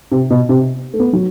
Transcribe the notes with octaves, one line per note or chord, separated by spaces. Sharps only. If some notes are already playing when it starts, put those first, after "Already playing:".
C3
B2
C3
A3
B3
F#3